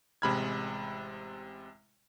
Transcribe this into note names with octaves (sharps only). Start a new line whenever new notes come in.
A1 C3 G#3 B5 F6 G#6